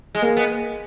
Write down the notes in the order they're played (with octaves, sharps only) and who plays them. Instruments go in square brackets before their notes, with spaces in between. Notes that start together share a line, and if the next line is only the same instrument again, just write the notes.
[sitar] G#3
[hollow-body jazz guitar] A#3
[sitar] B3